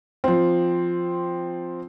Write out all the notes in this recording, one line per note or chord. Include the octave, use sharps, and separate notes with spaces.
F3 C4